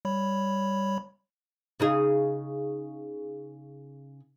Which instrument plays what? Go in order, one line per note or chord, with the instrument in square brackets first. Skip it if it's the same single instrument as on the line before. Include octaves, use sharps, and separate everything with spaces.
[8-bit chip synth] G3 C#5 B5
[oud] C#3 D#4 G#4